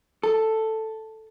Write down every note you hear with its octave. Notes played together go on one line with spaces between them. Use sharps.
A4